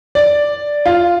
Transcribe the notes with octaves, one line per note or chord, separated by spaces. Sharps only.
D5
F4